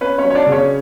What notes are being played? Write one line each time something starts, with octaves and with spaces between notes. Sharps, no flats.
C#4 B4
C#4 C#5
F#3
C#5
D4 D5
C#3
C#4 C#5